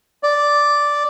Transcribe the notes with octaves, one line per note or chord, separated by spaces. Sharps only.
D5